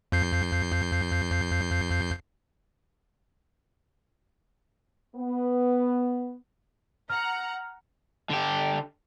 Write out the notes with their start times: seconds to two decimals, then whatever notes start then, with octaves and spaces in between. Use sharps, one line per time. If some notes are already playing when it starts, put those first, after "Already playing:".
0.12 F2 G6 C7
5.15 B3
7.10 F#5 A#5 F6
8.30 D3 G4